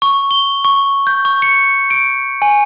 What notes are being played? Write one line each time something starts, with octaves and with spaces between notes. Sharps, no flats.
C#6
G7
C#6
G6
C#6
C#7
D7
G#5